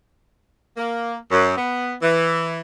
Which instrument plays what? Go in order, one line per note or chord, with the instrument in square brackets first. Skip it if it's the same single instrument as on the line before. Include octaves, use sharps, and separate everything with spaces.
[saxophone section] A#3
F#2
B3
E3